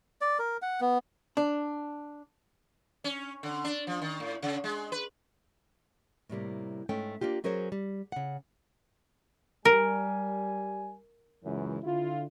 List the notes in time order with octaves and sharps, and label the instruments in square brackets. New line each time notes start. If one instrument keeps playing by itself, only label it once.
[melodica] D5
A#4
F#5
B3
[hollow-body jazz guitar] D4
[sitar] C#4
D3
D4
F3
D#3
A2
C#3
G#3
B4
[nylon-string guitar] A2 C3 G3 A#3
G#2 A3 C#4 G5
A#3 D4 F4 G4
F#3 C#4 G#4 A#4 C5 C#5
G3
C#3 F#5
[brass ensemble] G3 G#5 [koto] A#4
[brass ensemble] C#2 F#2 E3
D3 E4 F4